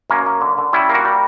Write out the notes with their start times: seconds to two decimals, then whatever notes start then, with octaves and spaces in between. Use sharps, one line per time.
0.10 F#2 A#3 C#4
0.26 A#3
0.41 D3
0.58 D3
0.73 G3 C#4 E4
0.89 A#3
0.94 F#4 A#4
1.05 G3